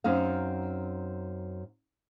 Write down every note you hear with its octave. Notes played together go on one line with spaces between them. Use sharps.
F#2 C4 D#4 F5